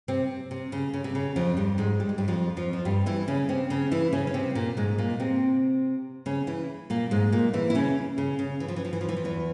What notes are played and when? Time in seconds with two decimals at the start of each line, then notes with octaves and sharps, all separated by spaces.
0.08 C3 C4
0.51 C3
0.72 C#3
0.94 C#3
1.04 C3
1.15 C#3
1.36 F2 F3
1.57 G2 G3
1.78 G#2 G#3
2.00 G3
2.09 G#3
2.18 G2 G3
2.28 F2 F3
2.57 F2 F3
2.73 F3
2.85 G2 G3
3.06 E3 E4
3.28 C#3 C#4
3.49 C3 C4
3.70 C#3 C#4
3.91 E3 E4
4.13 C#3 C#4
4.27 C#4
4.34 C3 C4
4.55 A#2 A#3
4.77 G#2 G#3
4.98 A#2 A#3
5.20 C3 C4
6.26 C#3 C#4
6.47 E3 E4
6.90 A#2 A#3
7.11 G#2 G#3
7.32 A#2 A#3
7.53 E3 E4
7.70 E4
7.75 C#3 C#4
8.18 C#3
8.39 C#3
8.60 E3
8.68 F3
8.76 E3
8.85 F3
8.93 E3
9.01 F3
9.09 E3
9.17 F3
9.24 E2 E3